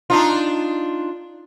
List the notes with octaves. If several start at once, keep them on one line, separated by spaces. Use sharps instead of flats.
D4 D#4 F4